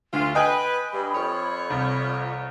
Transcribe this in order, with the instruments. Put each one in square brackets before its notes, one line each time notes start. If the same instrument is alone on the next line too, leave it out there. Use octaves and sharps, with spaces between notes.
[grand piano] D2 [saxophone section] F4
[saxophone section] B4 [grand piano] D#5 G5 G#5 [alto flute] B5
[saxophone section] G2
F2 C#5
[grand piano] C2